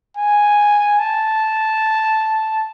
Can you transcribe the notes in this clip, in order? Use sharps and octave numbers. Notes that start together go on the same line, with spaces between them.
G#5
A5